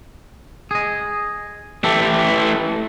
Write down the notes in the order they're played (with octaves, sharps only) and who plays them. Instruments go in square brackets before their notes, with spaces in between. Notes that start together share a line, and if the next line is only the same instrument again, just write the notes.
[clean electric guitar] G#4 D#5
[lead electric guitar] E3 A3 [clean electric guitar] G4 A4